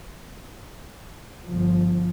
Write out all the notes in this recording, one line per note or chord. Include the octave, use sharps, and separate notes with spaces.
G1 F3